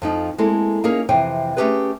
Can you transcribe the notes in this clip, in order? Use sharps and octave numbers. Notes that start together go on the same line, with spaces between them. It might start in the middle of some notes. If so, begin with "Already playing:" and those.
F2 F3 D#4
G#3 A#3 C4 E4 A4
A#3 C#4 D#4 G#4 A#4
F2 C3 E3 C5 G5
A3 C#4 D#4 G4 G#4 B4